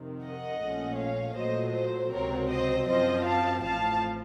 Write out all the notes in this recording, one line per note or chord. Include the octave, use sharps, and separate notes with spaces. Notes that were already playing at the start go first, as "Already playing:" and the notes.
Already playing: F2 C3 D#3
D#5 F#5
A#1 A#2 A3 C#4
C#5 F5
A#2 F#3 A3 C5 D#5
C5
C#2 C3 F#3 C4 A#4 C#5
C5 D#5
F#2 F3 C4 C5 D#5
F5 A5
A1 A2 F3 F5 A5